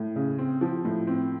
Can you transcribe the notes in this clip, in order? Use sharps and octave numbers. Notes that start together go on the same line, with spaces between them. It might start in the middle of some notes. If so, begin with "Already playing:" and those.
Already playing: A2
C#3
C4
F3
A2
C4